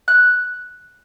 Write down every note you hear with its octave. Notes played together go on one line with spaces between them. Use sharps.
F#6